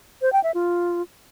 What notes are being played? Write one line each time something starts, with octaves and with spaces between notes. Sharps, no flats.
C5
G5
E5
F4